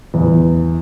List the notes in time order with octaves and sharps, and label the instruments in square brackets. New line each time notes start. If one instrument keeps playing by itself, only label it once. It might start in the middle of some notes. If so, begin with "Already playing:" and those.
[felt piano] E2